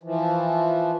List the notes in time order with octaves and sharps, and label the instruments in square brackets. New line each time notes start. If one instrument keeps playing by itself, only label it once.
[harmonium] E3 F3